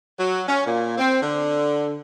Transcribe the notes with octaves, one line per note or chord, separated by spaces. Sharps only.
F#3
C#4
A#2
C4
D3